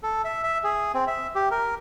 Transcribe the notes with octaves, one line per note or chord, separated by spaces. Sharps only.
A4
E5
E5
G#4
C4
E5
G4
A#4